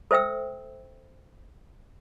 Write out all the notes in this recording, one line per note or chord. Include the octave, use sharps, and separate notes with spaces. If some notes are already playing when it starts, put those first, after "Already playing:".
A4 C5 E5 G5 E6